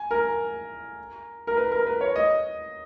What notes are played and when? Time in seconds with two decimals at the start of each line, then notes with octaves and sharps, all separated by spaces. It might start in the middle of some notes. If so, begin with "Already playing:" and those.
Already playing: G#5
0.11 A#4
1.47 A#4
1.57 B4
1.72 A#4
1.87 B4
2.01 C#5
2.16 D#5